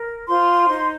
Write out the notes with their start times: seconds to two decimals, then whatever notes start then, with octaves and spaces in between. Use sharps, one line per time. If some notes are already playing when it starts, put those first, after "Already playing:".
Already playing: A#4
0.28 F4 C5 C6
0.68 D#4 C5